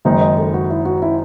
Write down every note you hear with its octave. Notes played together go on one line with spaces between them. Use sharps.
F#1 F#2 D#3 G#3 D#4
D#5
A4
F#4
E4
F#4
E4